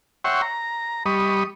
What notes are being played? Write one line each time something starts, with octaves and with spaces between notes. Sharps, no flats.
C#5 E5 F#5 G5 C6 C#6
A#5
G3 D#5 B5 C#6 D#6